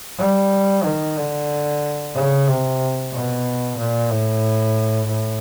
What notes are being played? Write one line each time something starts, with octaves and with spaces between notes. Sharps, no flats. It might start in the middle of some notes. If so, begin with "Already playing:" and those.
G3
D#3
D3
C#3
C3
B2
A#2
A2
A2